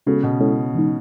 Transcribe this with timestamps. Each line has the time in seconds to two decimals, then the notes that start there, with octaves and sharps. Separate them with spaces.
0.06 C#3 G#3 B3 F#4 A4
0.23 B2
0.40 G#3 C#4 E4 A4 C#5
0.74 E3 G#3 D#4